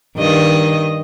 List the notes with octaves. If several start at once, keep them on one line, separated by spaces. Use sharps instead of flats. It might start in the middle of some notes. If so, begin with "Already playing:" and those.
G2 D#3 D#5